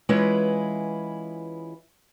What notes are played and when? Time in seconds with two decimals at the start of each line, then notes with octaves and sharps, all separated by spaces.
0.09 E3 G#3 C#4 E4 F4 B4